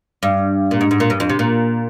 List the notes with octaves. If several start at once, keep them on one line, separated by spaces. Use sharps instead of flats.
G2
A#2
G#2
G#2
A#2
G2
F2
C3
A#2